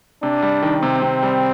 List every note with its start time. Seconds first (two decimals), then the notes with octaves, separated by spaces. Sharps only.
0.23 C3 D4
0.43 G3
0.63 D#3
0.82 C3 C4
1.02 C3
1.23 G3